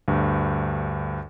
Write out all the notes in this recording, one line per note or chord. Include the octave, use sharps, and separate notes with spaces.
D2 G2